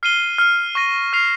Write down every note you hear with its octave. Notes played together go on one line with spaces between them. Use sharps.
F6 C7 D#7 G7
F6 C7 G7
C#6 F6 A#6 D#7
F6 C7 F7